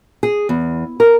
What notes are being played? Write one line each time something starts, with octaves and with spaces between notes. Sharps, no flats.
G#4
E2
A#4